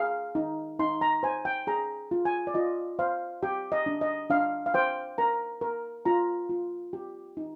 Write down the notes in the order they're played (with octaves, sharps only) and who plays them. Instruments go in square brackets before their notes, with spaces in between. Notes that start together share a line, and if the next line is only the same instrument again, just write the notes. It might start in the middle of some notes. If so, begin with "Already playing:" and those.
Already playing: [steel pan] G#4 F5
D#4
D#4 C6
A#5
C5 G#5
G5
G#4 A#5
F4
G#5
D5
F4 D#5
C5 F5
G4 G5
D#5
D4
D#5
D4 F5
F5
C5 G5
A#4 A#5
A#4
F4 A#5
F4
G4
D#4